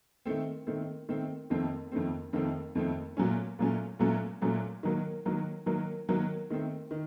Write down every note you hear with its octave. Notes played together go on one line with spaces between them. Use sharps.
D#3 A3 C4
D#3 A3 C4
D#3 A3 C4
F2 D#3 A3 C4
F2 D#3 A3 C4
F2 D#3 A3 C4
F2 D#3 A3 C4
A#2 F#3 A3 C#4
A#2 F#3 A3 C#4
A#2 F#3 A3 C#4
A#2 F#3 A3 C#4
D#3 F#3 A#3
D#3 F#3 A#3
D#3 F#3 A#3
D#3 F#3 A#3
D#3 A3 C4
D#3